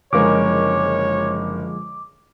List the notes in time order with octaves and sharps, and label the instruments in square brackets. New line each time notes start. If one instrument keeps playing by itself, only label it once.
[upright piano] F#1 A#4 [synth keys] D3 F3 G#3 [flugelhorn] C#5 [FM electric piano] D6